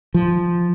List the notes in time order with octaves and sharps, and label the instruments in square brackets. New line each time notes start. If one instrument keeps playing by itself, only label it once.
[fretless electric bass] F3